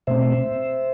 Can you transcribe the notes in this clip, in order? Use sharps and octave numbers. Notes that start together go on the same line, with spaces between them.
B2 A3 C4 C5 E5